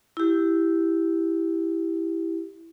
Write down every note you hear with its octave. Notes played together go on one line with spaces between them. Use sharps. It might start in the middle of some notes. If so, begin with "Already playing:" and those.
E4 G4